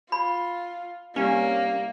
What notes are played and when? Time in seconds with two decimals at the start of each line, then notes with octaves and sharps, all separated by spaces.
0.12 F4 B5
1.16 C2 A#3 C#4